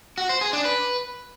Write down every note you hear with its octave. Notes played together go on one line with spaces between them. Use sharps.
F#4
C5
G#4
D4
B4